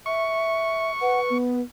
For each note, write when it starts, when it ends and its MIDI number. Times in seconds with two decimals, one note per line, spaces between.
0.06 0.91 76
0.06 1.38 85
1.01 1.62 71
1.01 1.20 78
1.30 1.61 59